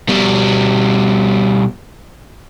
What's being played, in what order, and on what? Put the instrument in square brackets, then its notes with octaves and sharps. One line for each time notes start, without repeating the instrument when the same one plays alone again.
[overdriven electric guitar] B2 G3